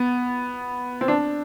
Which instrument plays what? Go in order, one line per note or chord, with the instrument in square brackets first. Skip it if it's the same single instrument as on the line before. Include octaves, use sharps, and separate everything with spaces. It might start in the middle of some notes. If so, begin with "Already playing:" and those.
Already playing: [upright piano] B3
C4
D4